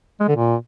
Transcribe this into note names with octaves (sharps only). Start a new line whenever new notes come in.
G#3
D3
A#2